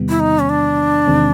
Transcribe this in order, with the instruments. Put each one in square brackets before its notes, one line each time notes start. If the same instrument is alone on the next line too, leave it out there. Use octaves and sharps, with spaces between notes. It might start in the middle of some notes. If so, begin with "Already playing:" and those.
Already playing: [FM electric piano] E2 C3 D#3 G3 B3
[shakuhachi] E4
D#4
C#4
D4
[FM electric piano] E2 C3 D#3 G#3 C4